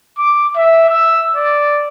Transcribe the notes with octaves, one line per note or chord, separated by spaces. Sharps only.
D6
E5
E6
D5